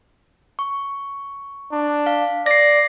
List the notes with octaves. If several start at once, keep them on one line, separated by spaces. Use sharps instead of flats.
C#6
D4
F5
D5 A#6 C7